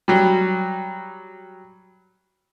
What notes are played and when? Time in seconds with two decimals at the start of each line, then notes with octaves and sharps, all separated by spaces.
0.08 F#3 G3